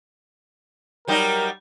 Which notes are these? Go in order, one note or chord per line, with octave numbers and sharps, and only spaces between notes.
F#3 G3 D#4 A#4